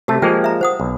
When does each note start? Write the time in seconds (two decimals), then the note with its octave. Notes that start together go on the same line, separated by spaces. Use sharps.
0.08 C3 A3 F#4 G4 A5
0.22 F3 G#3 A#3 G#4 G5
0.44 E5 A#5
0.61 C5 F#5 D#6
0.80 B1